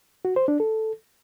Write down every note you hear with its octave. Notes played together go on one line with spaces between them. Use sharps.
F#4
C5
D4
A4